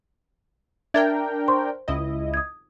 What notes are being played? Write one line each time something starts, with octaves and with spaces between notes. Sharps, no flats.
D4 A#4 E5 G5 G#6 A6
C5 C6 C#6
C#2 E4 D#5
D#6 G#6